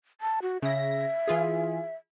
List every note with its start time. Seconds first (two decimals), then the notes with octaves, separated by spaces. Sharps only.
0.21 A5
0.42 F#4
0.62 C#3 E5 A#6
1.28 E3 F4 G#4